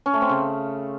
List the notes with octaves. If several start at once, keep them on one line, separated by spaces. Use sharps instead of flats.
C#4
A3
C4
C#3